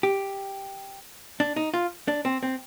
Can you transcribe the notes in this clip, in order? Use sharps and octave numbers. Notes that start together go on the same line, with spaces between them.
G4
D4
D#4
F4
D4
C4
C4